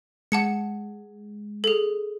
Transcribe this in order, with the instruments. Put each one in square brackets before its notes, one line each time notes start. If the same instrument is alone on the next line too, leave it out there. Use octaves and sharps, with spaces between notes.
[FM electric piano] G#3 [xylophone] F#5 A5 C#7
[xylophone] G#4 A4